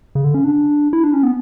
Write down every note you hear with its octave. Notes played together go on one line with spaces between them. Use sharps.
C#3
D3
C#4
D4
E4
D4
C#4
B3